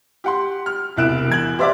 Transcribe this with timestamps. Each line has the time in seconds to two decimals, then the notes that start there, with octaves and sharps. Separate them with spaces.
0.24 G4 F#5 C6
0.66 F6
0.96 E1 C2 E4 F#6 D7 E7
1.29 E2 G#6 F#7
1.59 G4 C5 D5 E5 F5 D6